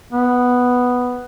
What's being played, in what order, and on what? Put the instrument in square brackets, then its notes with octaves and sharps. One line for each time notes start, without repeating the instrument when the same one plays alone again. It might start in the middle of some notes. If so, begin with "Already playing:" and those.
[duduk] B3